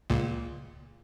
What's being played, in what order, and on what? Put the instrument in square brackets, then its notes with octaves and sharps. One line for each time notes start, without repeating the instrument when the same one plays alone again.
[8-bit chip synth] C#2 A#2